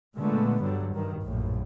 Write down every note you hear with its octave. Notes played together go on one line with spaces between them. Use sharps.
A#2 D3 G#3 A3 B3
G2 D3 F#3 G3
G2 D#3
A#1 F#2 A2